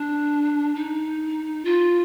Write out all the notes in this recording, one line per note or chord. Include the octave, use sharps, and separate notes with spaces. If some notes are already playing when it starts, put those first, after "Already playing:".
Already playing: D4
D#4
F4